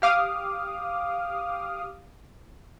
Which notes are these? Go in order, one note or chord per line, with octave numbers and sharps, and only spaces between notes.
G4 F5 D6 D#6 F6